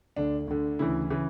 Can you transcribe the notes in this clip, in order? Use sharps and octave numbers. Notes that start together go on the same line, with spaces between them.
D2 D3 D4
D2 D3
D2 C#3 E3 E4
C#3 E3